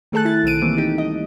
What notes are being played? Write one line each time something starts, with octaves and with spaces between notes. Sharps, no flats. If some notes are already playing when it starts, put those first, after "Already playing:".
D#3 A3 G#4 A4 A5 F#6
E4 A6
B1 D#3 C4 D7 D#7
E3 G3 A3 A#3 C4
D#4 G4
D#5